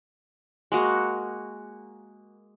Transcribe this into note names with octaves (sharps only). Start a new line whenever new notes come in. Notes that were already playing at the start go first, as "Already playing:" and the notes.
G#3 A#3 F#4